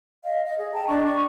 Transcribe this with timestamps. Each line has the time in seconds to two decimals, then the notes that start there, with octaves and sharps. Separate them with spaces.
0.24 D#5 F5
0.45 D#5
0.58 G#4
0.74 G5 A5 A#5
0.88 D4 D5 D#5 C#6
1.03 C#6